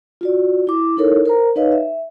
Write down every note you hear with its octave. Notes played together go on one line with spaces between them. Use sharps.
F4 F#4 D5
E4 D6
D#4 E4 A4 A#4 C#5
A#4 C5 A#5
D#4 B4 C#5 D#5 F5
E5